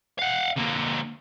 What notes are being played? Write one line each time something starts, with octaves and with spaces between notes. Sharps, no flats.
F5 F#5
D3 A#3